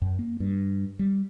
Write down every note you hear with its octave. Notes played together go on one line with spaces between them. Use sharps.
F#2
A#3
G2
G3